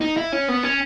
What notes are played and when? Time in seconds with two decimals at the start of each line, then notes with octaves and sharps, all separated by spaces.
0.01 D#4
0.17 E4
0.32 C#4
0.48 B3
0.63 C#4